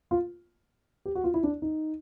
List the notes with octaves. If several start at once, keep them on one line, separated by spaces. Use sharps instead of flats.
F4
G4
F#4
F4
E4
D4
D#4